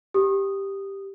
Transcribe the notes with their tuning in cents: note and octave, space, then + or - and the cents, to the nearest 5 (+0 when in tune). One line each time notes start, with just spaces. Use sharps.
G4 +0 D#6 -10